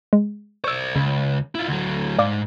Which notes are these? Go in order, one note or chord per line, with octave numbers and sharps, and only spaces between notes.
G#3
C5 D5 C#6 E6
C#2 C#3
E4 F4
D2 F#3
G#2 D5 F5 D6